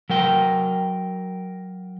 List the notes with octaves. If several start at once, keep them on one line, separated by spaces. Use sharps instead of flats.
F#3 A#4 G5